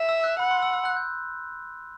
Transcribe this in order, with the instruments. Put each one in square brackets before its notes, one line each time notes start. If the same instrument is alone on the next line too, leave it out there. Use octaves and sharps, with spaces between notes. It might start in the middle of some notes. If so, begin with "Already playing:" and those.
Already playing: [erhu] E5
[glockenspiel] E6
F#6
[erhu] F#5 [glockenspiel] B5
[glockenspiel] C6
E6
E6
F#6
G6